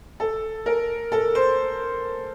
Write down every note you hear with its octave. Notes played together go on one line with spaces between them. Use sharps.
A4
A#4
A4
C5